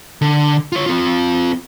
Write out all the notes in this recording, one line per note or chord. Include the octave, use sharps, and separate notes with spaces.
D3
F4 C#5
C4 F4